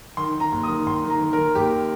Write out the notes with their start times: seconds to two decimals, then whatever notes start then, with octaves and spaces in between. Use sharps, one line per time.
0.17 D#3 C6
0.34 D#3
0.40 A#5
0.52 D#2
0.63 D#6
0.69 D#3
0.86 D#2 C6
1.04 D#3
1.10 A#5
1.21 D#3
1.33 D#3 A#4
1.55 D#2 G4